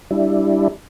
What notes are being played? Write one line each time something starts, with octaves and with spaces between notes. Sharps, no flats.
G3 D4 E4